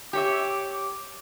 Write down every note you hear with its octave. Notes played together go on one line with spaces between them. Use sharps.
G4 C#5 E5 D6